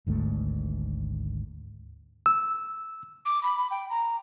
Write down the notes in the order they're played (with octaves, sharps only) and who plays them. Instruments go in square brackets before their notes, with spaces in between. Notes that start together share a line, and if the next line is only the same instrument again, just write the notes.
[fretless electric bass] G#1 D2 G#2 A3
[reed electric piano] E6
[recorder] D6
B5
B5
G5
A#5